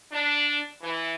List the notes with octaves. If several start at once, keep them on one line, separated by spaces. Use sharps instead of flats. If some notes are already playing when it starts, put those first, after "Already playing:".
D4
E3